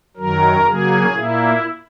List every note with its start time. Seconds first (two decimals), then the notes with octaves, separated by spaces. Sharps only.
0.17 F#2 D#3 F#3 A#4
0.65 C#3 F#3 A#3 G#4
1.12 A#2 A#3 E4